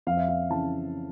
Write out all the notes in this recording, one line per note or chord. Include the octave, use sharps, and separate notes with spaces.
F2 F5
E5
F5
C#3 E3 A5